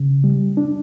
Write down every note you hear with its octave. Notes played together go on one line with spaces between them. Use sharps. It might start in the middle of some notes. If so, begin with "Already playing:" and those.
Already playing: C#3
G3
D4